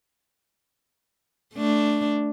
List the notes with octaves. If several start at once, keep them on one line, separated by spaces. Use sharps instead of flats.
A3 D4